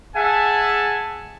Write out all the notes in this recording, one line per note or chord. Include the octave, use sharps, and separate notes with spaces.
G#4 E5 F#5 G#5 A5